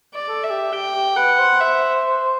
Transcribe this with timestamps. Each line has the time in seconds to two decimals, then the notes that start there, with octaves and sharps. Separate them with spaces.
0.14 D5
0.28 A4
0.43 E5
0.50 G4
0.72 G4 G5
0.95 G4
1.16 B4 F#5
1.39 C5
1.60 E5